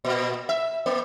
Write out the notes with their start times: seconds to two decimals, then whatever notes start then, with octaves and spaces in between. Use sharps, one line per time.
0.05 A#2
0.49 E5
0.86 A#3